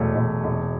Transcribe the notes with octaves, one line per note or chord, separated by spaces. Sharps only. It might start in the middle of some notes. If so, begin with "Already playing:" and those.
Already playing: E1 F#3 A3
E1
E1